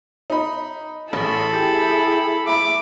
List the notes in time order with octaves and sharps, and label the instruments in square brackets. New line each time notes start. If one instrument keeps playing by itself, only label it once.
[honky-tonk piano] D#4 B5
[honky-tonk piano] A1 [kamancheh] E4 G#4 [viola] A4 B5
[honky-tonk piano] G4
[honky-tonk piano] E5 B5 [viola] D6